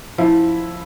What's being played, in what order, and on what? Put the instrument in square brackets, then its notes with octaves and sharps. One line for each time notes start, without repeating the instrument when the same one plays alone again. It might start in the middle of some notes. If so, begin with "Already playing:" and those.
[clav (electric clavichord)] F3 [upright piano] E4